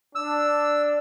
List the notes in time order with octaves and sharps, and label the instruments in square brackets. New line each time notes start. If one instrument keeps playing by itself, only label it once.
[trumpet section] D4 [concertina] E6